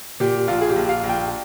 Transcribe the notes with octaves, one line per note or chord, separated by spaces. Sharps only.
A#2 G4
A#1 F4
G#4
G4
A#1
F5
A#1
G5